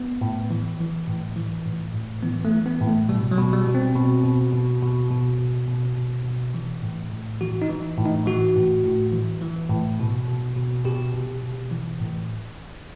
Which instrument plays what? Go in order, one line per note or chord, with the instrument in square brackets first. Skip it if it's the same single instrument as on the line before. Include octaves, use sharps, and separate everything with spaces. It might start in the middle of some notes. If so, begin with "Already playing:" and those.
Already playing: [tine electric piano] B3
A2
E3
E3
A2
E3
A2
A2
E3 B3
A3
E3
B3
A2
A3
B2 G3
F#3
B2
G3
B2
C4
B2
B2
B2
B2
B2
B2
B2
B2
B2
E3
A2
A2
E3 F#4
D#4
E3
A2
D#4
E3 F#4
A2
A2
E3
E3
A2
B2
B2
B2
B2 G4
B2
B2
E3
A2